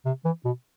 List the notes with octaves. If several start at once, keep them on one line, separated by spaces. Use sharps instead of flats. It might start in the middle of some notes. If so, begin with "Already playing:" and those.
C3
E3
B2